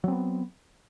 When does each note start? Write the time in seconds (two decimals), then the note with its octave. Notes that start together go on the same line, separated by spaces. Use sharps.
0.04 F#3
0.08 C4
0.12 B3